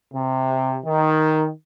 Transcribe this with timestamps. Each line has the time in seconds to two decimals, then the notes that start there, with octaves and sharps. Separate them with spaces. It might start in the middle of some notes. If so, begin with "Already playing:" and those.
0.13 C3
0.84 D#3